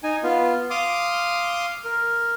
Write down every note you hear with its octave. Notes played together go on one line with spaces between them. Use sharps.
D#4 G#5
B3 F4
F5 C6 D6 D#6
A#4